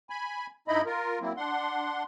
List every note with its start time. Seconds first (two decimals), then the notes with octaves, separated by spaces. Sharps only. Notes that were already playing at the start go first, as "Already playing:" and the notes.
0.10 G#5 B5
0.68 G2 D#4 E4 D#5 B5
0.86 F4 A#4
1.21 F#3 A#3 C4 E4
1.37 D4 F#5 C6